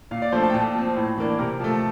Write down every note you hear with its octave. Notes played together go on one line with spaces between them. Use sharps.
A#2 F5
D5
F3 A3 D4 C5
A5
G5
A#2 A5
F3 C4
A2
E3 A#3 D4
C3 A#4
F3 A3